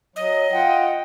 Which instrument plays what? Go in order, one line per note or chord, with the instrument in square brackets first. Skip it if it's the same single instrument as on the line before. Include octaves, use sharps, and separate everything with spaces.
[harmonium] F#3 [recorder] D#5
[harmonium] F4 F#5 G5